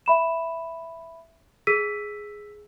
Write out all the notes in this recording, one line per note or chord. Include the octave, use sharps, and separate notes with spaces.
E5 B5 E7
G#4 E6 B6 D#7